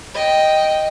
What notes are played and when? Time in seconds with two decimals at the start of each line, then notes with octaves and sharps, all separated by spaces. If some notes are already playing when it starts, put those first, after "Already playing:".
0.15 D#5 G5